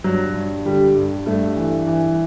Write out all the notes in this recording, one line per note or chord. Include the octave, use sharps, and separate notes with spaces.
G2 F#3
G2
D3 G3
G2
G2 A3
E3
E3